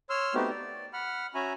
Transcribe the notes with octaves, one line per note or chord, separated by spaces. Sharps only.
C#5 C6 E6 F6
A3 B3 C4 D#4 F#4 G4
D5
F#5 B5 F6
C#4 F#4 E5 G#5 A#5 B5